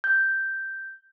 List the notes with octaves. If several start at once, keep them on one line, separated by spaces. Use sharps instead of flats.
G6